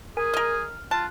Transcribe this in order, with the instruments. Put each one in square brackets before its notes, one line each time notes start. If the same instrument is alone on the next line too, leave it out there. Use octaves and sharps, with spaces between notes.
[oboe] G#4 [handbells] A#4 G#5
[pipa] A#4 D#5 [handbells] F6
[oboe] F4 [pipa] A5 [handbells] F#6